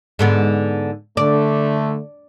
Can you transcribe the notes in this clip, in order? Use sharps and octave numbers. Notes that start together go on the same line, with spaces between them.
G#2 D3 B3
D3 A3 D4